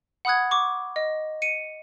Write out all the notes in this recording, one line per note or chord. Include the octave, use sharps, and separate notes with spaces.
F#5 B5 D#6 F#6 G#6
C#6 D6
D#5
C#7 D#7